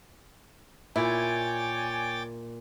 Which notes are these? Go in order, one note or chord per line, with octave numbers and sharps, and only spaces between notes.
A#2 E4 C#5 D5 G5 G#5 D6 A6